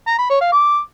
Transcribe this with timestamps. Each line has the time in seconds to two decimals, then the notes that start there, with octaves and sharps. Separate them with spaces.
0.07 A#5
0.18 B5
0.30 C#5
0.41 F5
0.52 D6